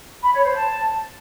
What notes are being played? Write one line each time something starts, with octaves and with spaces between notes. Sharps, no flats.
B5
C#5
C5
A5